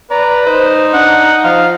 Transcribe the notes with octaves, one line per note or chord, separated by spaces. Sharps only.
B4 D5 A#5
D#4 C5
D4 F#5
F3 F5